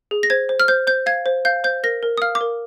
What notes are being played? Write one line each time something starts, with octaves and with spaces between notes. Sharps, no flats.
G#4
A#6
C5 G#6
C5
F6
C5 G6
C5 G6
F5 G#6
C5
F5 G6
C5 G6
A#4 A#6
A#4
D#6
F5 F6
D6
A#4